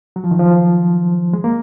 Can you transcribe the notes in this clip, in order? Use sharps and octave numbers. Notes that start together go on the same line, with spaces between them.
F#3
F3
D#3
F3
G#3
A#3